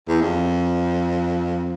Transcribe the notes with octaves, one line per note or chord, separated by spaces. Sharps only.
E2
F2